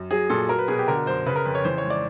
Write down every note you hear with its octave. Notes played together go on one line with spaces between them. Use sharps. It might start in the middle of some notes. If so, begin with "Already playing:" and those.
Already playing: F#2
F#3 G#4
A#2 A4
F#3 A#4
B4
B2 G#4
G4
D3 A#4
F#2 C5
C#3 B4
A#4
F2 B4
C#5
E3 C5
C#5
G#2
D5